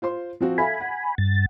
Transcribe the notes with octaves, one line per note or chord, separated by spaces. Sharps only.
F4 C5 C6
F3 C4 F#4
A4 E5 F5 G#5 B5
F#5
G2 A6